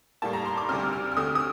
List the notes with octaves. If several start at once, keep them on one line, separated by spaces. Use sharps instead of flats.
A2 G3 A#3 A5
A#5
C6
D6
D2 C3 G3 C4 F6
F6
F6
D2 D3 A3 C4 D#6
D#6